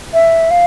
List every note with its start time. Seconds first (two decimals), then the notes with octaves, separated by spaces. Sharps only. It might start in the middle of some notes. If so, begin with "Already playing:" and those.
0.13 E5
0.51 F5